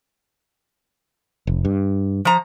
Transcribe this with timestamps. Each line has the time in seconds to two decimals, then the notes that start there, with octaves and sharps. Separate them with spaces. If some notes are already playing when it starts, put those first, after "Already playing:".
1.47 F1
1.65 G2
2.25 F3 A#5